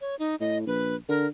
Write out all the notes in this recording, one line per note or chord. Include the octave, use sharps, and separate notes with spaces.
C#5
D#4
A2 D#5
A#1 B4
D3 A#4